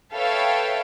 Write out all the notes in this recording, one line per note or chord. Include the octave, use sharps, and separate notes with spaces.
A4 B4 C#5 E5 F5 G5